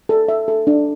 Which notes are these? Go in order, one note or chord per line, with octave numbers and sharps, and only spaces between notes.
A4
E5
A4
D4